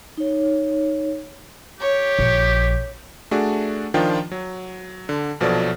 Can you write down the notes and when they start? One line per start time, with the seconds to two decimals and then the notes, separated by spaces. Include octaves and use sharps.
0.17 D#4 C#5
1.80 G4 C#5
2.19 A#1
3.31 A3 D4 F#4 G#4 D5
3.94 D#3 F3 D4 F4 G5
4.31 F#3
5.09 D3
5.40 A#1 B2 F3 F#3 A4 D5